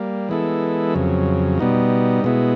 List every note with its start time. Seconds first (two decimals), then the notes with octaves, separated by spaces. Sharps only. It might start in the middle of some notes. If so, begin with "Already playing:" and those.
Already playing: G3 A#3
0.29 E3 G#3 B3 E4 A4
0.94 F2 C#3 F#3
1.59 B2 G3 B3 D#4
2.24 B2 G#3 B3 E4